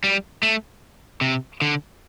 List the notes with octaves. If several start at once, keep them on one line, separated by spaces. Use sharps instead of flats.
G3
A3
C3
D3